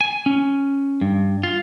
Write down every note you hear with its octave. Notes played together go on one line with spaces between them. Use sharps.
G#5
C#4
G2
F4